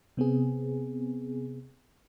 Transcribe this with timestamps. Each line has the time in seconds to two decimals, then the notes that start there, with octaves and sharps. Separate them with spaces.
0.17 C3 B3 C4 G#4